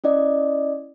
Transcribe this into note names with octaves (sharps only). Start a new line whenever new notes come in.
C#4 E4 D5 D#5